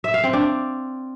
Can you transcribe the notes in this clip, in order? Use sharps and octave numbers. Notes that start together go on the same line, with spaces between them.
E5
F5
C4
D4